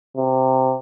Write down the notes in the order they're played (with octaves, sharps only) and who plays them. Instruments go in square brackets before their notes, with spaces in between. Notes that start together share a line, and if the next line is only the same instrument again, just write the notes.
[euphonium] C3